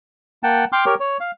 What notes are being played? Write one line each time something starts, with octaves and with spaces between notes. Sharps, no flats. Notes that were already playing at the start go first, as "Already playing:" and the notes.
A#3 F#5 G5 A5
G5 C6 D6 F6
G4 A#4 C#5
C#5
F5